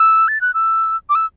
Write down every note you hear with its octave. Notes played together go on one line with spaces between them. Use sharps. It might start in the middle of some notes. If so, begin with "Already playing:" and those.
Already playing: E6
A6
F#6
E6
D6
E6